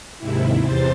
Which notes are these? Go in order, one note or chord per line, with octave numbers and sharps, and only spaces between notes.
D#2 G#2 C3 E4
E2 C3 C5 A6